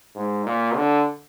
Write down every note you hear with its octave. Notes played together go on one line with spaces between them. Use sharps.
G#2
A#2
D3